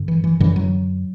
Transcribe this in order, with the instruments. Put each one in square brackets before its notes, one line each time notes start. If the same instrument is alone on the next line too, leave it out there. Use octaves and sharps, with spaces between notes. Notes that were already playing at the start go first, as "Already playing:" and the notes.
Already playing: [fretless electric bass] G2 D3
E3
E3
F#2 D3 E3
F#3